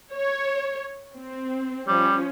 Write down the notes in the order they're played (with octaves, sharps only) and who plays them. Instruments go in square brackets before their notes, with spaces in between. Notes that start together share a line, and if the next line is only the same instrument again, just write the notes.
[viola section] C#5
C4
[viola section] F3 C#4 [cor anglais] G3